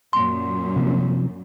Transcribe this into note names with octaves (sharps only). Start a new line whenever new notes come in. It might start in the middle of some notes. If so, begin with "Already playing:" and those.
F#2 A#2 C6
C3 F3